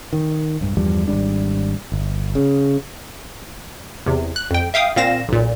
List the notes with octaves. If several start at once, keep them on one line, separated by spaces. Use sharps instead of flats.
D#3
B1 G2
E2 G2 F3 G3
G#1 F2 G3 D4
G1
C#3
E2 C3
F#6
F2 G5
E5 F5 G5 D#6
A#2 C4 F5 A#6 E7
B1 A#2